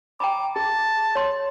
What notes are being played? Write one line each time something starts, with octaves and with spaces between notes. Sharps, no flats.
G5 A#5 B5 D6
G#4 A5
C#5 C6